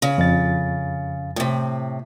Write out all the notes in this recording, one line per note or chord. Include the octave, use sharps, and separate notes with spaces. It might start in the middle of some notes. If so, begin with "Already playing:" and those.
C#3
F2 A6
A2 C3